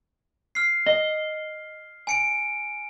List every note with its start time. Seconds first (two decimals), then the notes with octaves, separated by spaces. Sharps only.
0.55 F6 C7
0.86 D#5
2.07 G#5 C#7 D7